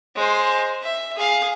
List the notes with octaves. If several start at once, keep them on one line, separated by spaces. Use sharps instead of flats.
G#3 C5
E5
G#4 F5